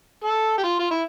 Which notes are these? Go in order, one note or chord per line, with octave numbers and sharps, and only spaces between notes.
A4
G4
F4
F4
E4